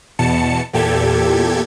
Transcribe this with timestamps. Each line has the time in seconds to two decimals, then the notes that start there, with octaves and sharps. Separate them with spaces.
0.19 E2 B2 A5 C#7
0.73 E2 A#2 G4 A4 G#6